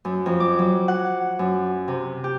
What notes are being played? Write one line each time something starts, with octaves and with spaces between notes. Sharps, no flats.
F#2
F2
D6
F#3
F#5
F#2
C3
G4